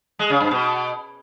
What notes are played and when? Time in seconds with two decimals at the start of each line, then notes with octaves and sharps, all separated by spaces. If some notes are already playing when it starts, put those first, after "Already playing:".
0.19 G#3
0.30 C#3
0.40 G2
0.51 B2